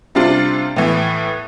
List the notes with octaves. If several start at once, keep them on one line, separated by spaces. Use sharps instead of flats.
C3 G3 D4 F4
A2 E3 B3